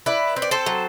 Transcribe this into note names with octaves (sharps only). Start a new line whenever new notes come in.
E4 B4 D5
C4
D5
A4 C5
F#3